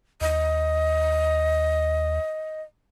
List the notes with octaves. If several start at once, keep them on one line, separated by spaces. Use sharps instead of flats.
D#2 D#5